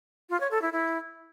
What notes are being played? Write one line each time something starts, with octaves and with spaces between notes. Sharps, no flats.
F4
C#5
A4
E4
E4